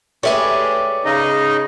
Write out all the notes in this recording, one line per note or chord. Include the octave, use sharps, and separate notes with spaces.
G#3 A3 G4 G#4 B4 C#5 D5 E5
C#3 D#4 D#5